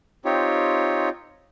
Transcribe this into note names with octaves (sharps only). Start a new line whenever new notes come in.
C4 D#4 F4 G4 C#5